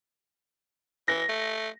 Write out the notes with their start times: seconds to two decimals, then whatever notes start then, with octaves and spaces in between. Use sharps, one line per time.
1.08 E3 A#6
1.29 A3